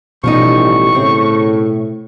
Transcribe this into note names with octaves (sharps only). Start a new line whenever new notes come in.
A1 B2 F3 G3 D#4 C#6
A2 C#3 C4